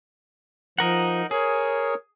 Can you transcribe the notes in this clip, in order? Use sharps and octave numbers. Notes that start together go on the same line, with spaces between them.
F3 D#4 A#4 F#5
G#4 A#4 C#5